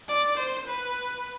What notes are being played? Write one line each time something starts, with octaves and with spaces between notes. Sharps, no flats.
D5
C5
B4